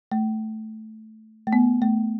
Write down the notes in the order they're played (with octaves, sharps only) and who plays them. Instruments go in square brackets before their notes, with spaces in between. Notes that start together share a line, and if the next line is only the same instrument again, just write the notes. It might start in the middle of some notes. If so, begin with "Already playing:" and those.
[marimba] A3
A3
B3
A3